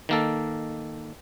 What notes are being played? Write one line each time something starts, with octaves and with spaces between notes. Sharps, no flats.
D#3 A#3 A4